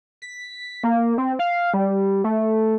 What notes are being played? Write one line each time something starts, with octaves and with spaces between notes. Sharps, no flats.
B6
A#3
C4
F5
G3
A3